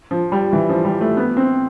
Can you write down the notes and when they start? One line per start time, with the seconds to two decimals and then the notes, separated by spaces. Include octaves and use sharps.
0.11 F3
0.32 G3
0.53 E3
0.69 F3
0.85 G3
1.01 A3
1.17 B3
1.37 C4